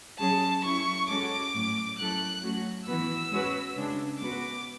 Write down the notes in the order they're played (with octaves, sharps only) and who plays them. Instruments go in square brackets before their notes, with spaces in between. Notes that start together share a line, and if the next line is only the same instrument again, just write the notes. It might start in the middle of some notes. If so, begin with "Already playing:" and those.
[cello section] F#3 C#4 G#4 [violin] A5
[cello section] F#3 C#4 E4 [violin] C#6
[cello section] G#3 C#4 F#4 A4 [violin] D6
[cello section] A2 F#3 C#4
[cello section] F#3 C#4 E4 A4 [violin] F#6
[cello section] F#3 A3 C#4 F#4
[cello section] E3 B3 F#4 B4 [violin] E6
[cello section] G#3 C#4 F#4 B4
C#3 G#3 D4
[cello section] G#3 B3 F#4 B4 [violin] D6